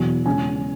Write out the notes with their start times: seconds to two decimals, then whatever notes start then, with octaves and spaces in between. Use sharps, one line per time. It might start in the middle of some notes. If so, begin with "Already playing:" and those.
Already playing: E2 B2 F#3 G#5
0.26 E2 C#3 G#3 C#4 G#5